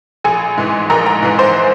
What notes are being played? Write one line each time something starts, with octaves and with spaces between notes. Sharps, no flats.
A#1 G#4 G#5
G#2 E3
A#1 A#4 A#5
A#4 A#5
G#2 E3
C5 C6